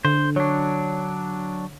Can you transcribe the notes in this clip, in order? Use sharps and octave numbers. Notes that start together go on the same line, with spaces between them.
D3 C5
F#3 D4 C#5